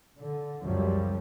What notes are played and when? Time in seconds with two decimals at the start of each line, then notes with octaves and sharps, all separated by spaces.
0.18 D3
0.63 C#2 F#2 F3 G3